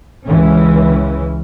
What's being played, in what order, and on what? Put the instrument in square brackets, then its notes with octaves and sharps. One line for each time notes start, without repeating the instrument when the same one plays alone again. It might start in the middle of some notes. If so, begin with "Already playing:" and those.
[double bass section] C#2 E3 C#4